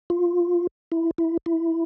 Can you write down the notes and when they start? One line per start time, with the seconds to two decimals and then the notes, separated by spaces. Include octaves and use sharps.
0.10 F4
0.92 E4
1.18 E4
1.46 E4